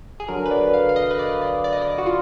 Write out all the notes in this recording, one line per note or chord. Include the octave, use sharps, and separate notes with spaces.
G#4
D3 F#3 A#4
B4
D5
F5
F5
D#5
B4
D5
D5
D5
D#5
D5
F#4
F4